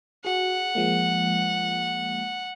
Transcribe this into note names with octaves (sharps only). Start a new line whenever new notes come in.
F#4 G#4 F#5
F3 G#3 A#3